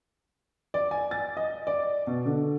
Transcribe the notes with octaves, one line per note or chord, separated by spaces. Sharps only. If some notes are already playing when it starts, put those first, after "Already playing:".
D5
G#5
A6
D#5
D5
B2
D3